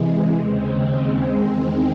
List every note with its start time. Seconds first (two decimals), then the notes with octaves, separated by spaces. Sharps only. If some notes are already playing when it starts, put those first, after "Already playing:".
Already playing: C3 E3 G#3
0.31 D#2 C#3 G#3 C4
1.24 E2 D#3 G#3 C4